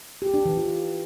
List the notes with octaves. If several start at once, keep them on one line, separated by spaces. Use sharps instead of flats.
G4
D4
E3
F4